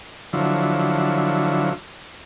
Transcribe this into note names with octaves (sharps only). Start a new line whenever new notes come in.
D3 F3 F#3 E4